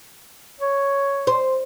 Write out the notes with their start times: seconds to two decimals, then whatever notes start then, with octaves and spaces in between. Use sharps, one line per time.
0.61 C#5
1.27 C5